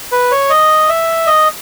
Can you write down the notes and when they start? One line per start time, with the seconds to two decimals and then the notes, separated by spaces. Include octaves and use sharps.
0.12 B4
0.31 C#5
0.50 D#5
0.89 E5
1.27 D#5